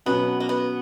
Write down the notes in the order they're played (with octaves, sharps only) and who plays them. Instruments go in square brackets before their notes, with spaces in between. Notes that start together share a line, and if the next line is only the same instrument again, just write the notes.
[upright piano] B2 F#3 C#4 F#4 B4 [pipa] B3
[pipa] A#3
B3